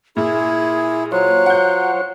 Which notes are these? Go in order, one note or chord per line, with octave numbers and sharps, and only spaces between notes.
A#2 E4 G#4
F#3 F4 C5 C#5 F#6
F#5 G6